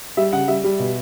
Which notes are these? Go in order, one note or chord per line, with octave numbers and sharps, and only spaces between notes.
G3 E5
C#3 F#5
G3 E5
G3
B2